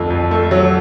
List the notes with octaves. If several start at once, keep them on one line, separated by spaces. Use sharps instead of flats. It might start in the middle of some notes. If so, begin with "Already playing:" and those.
Already playing: F2 D3 A3
F2
A3
F#3